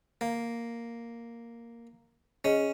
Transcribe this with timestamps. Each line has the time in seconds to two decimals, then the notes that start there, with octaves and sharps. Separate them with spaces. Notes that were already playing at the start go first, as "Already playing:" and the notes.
0.21 A#3
2.45 C#4 G#4 D#5